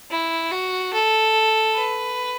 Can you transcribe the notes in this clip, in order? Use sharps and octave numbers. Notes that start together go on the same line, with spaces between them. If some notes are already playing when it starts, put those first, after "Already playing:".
E4
F#4
A4
B4